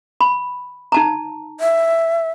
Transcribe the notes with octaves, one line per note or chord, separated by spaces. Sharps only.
B5
D#4 A5 A#5
E5